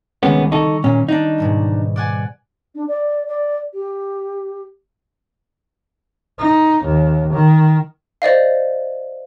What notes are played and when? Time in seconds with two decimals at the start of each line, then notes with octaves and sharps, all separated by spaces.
0.23 C2 D#3 G3 G#3 B3 C#4
0.52 D#4 A4 C#6
0.84 A#2 C#4
1.09 D4 D#4 D#5
1.38 G#2 B2 G3
1.96 D5 F#5 G#5
2.75 D4
2.88 D5
3.28 D5
3.74 G4
6.39 D#4
6.84 D#2
7.33 D#3
8.22 C5 D5 D#5 F5